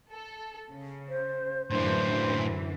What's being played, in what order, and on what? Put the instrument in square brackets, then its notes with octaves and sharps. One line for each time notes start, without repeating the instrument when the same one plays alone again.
[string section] A4
C#3
[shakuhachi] C5
[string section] F#2 D3 E3 [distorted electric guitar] A2 A#3 [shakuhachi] D4 [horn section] C5